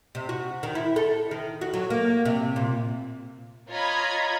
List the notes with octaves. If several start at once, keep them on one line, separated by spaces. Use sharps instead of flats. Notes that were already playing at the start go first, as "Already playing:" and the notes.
C3
F#4
D#3
E4
A4
D#3
F#4
F#3
A#3
C3
A#2
F4 C#5 D#5 A#5 B5 G#6